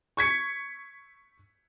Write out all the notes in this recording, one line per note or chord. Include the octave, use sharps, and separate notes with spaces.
C#6 G#6 B6 C#7